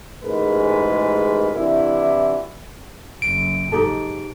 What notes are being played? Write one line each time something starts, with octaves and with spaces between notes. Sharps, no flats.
A1 G#2 G#3 A#4 B4
C3 E3 D4 E4 F#4
F#1 F#2 D7
G#2 D#4 G4 A4